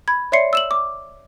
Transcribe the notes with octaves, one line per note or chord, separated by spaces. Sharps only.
B5 G#6
C#5 D5 E5 C6 C7 C#7
E6 E7 F#7
D6